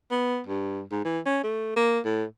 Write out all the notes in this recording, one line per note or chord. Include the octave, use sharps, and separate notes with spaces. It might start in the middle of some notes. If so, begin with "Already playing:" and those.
B3
G2
G#2
E3
C#4
A3
A#3
A2